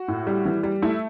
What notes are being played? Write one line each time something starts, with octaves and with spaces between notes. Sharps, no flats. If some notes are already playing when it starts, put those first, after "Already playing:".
Already playing: F#4
A2
G3
E3
G3
A3 E4